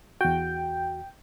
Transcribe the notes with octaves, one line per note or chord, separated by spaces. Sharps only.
E2 F#4 G5